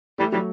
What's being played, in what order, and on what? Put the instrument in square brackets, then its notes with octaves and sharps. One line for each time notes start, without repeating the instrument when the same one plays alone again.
[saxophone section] E3 G3 [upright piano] A3
[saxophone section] E3 G3 [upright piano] F#3